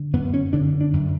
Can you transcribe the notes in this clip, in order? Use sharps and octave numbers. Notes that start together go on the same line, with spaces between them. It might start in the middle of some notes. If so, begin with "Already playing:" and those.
Already playing: D3
F#2 B3
C#4
D3 D4
D4
F#2